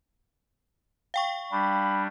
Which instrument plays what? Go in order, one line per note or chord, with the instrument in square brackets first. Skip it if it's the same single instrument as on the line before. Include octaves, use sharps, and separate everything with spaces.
[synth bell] F5 G5 C#6
[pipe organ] G3 D4 [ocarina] B5